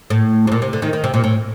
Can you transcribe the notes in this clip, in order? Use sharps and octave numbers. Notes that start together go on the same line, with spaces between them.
A2
C3
A#2
C3
D3
D#3
D#3
C3
A#2
A2